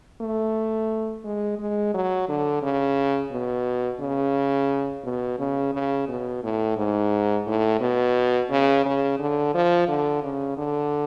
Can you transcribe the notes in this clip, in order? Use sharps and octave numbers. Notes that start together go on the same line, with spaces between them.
A3
G#3
G#3
F#3
D3
C#3
B2
C#3
B2
C#3
C#3
B2
A2
G#2
A2
B2
C#3
C#3
D3
F3
D3
C#3
D3